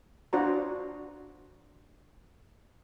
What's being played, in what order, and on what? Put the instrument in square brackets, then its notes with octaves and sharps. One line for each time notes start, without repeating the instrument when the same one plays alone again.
[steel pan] D4 F4 F#4 C5 D5 A#5